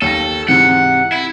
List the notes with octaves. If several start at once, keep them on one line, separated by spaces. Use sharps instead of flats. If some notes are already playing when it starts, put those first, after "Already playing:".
D#2 A4 G5 A#6
G#2 C3 E3 F#5
E4